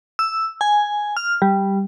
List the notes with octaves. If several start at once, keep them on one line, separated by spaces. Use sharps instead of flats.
E6
G#5
F6
G3